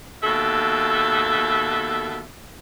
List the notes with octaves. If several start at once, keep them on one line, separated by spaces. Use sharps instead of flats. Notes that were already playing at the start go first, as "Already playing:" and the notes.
D#2 B2 A4 E5